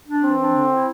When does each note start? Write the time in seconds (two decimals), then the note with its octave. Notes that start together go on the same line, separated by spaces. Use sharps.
0.08 D4
0.23 E3 C4
0.40 D4
0.55 D3
0.70 E4